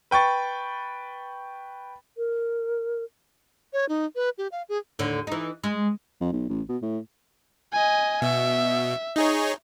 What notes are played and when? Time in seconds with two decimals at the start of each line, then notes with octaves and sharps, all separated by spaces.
0.11 B4 G5 C#6 A6
2.17 A#4
3.73 C#5
3.89 D#4
4.15 B4
4.38 G4
4.52 F5
4.69 G#4
4.99 D#2 A2 D3
5.27 E3 D#4
5.64 G#3
6.21 F2
6.33 B1
6.49 A1
6.69 B2
6.82 A2
7.72 D#5 G#5
8.22 B2 E5
9.16 D#4 G#4 C#5